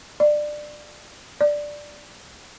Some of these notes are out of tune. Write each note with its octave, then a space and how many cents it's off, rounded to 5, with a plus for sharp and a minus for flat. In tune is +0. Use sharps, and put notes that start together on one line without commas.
D5 +20
D5 +5